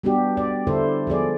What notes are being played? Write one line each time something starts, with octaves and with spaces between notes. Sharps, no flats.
G3 B3 D4 F#4 G4
D5
D3 E4 A4 C5
F3 B3 G#4 D5